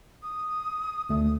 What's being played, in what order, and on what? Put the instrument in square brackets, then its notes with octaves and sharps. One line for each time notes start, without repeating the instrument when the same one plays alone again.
[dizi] D#6
[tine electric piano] D2 A3 [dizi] D#6